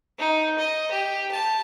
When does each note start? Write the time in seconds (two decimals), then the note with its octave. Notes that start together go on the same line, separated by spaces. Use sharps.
0.19 D#4
0.58 D#5
0.91 G4
1.32 A5